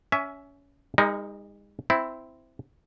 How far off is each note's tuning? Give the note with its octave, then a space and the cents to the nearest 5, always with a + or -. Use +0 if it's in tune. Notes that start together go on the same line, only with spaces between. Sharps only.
C#4 +20 E5 +0 G#5 +0
G#3 -40 D#4 +15 A#4 +0
C4 -10 E4 +0